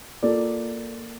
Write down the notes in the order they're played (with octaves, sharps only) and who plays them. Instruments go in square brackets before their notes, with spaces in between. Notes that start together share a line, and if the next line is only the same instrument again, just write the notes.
[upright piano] A#3 F4 A4 D5